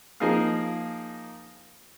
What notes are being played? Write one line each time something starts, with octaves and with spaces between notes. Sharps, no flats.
F3 A#3 D#4 G#4 A#4 F5